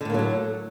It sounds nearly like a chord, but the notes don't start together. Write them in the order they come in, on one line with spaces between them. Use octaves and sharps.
D3 A2 A#3 F#3 A3